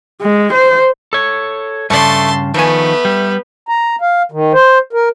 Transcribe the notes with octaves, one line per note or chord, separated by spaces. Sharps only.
G#3
C5
A4 C#5
G2 C#3 A3 A4 D5 A5 C6
D#3 F3 A3 B3 G#5
G3
A#5
F5
D#3
C5
A#4